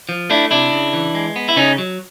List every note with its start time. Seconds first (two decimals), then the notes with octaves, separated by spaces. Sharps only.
0.09 F3
0.30 A3 D4 E4
0.51 C3 D4 E4
0.72 C#3
0.93 E3
1.15 G#3
1.36 B3
1.49 E4
1.56 C#3 C#4 D#4
1.78 F#3